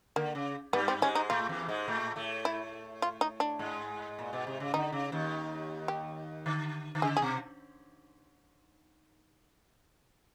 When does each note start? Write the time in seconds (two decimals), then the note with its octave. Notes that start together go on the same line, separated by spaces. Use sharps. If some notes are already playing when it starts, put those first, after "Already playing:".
0.16 D3 A#3
0.35 C#3
0.73 G2 G3 B3
0.88 C4
1.02 G#2 G#3 C#4
1.15 D#4
1.30 A2 A3 F4
1.49 E2 E3
1.68 G#2 G#3
1.88 A2 A3
2.16 A2 A3
2.45 E4
3.02 F4
3.21 D#4
3.40 D4
3.59 G#2 G#3
4.19 A#2
4.33 B2
4.47 C3
4.60 C#3
4.74 D3 D#4
4.92 C#3
5.12 D#2 D#3
5.88 G4
6.46 D3
6.95 D3
7.02 C#3 G#4
7.17 G#4
7.22 B2